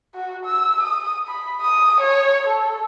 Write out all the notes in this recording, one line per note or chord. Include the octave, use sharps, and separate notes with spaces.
F#4
E6
D#6
B5
D#6
C#5
A4